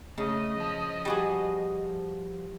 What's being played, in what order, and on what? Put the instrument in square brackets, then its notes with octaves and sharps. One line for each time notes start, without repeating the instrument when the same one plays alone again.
[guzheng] C#3 [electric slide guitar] A3 [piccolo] D#5
[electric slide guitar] F3 A5
[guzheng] G3 F#4 G#4